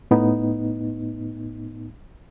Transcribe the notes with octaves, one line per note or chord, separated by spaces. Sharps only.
A2 B3 D#4